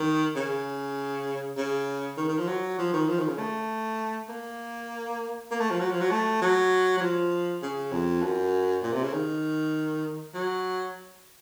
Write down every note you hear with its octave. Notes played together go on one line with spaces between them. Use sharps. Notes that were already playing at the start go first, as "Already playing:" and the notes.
Already playing: D#3
C#3
C#3
D#3
D#3
F3
F#3
F3
D#3
F3
D#3
C#3
A3
A#3
A#3
A3
F3
F#3
F3
F#3
A3
F#3
F#3
F3
C#3
F2
F#2
A#2
C3
C#3
D#3
F#3